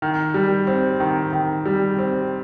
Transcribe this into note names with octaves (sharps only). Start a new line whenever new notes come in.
D#3
G3
C4
D#3
D#3
G3
C4